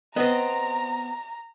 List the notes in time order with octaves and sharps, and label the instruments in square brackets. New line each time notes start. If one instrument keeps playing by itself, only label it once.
[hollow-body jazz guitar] B3 C4 [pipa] D#5 [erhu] A#5